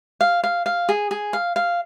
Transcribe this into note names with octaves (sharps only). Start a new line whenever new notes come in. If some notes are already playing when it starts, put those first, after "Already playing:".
F5
F5
F5
G#4
G#4
F5
F5